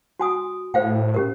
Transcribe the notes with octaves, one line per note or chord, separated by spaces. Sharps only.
F#4 G#5 D#6
A2 C5 F5 G5
C#4 G4 A#4